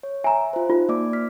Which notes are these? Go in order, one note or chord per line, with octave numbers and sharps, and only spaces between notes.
C#5
E5 G#5 A#5
F4 C5
D#4 F4
A#3 D5 D6
F6 B6